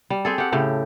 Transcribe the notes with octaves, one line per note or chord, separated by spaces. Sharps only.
G3
C4 G#4 A4
G4 F#5
A2 C#3 G4